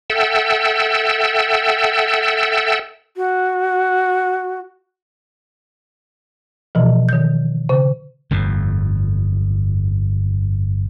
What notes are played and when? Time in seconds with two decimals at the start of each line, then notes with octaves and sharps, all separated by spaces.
0.10 A4 E5 F#5 G5 E6
3.17 F#4
6.75 B2 E3 F3
7.09 D#3 G6
7.69 C#3
8.31 G1 F2 A2